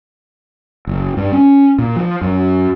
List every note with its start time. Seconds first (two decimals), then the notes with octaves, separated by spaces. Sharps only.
0.87 F#1
1.17 G2
1.33 C#4
1.78 A#2
1.96 F3
2.21 F#2